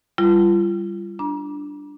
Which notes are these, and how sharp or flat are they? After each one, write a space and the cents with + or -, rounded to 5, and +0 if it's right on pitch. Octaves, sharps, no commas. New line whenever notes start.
G3 +0 F4 -35
D4 +0 A#5 +35